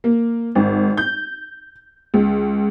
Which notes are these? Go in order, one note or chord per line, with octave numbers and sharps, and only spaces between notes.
A#3
G#1
G6
C#2